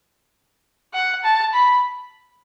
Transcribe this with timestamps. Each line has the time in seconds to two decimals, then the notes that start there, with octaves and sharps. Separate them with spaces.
0.93 F#5
1.24 A5
1.53 B5